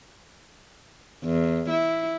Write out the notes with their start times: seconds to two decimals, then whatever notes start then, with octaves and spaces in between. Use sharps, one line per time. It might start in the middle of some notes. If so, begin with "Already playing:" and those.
1.25 E2
1.71 E4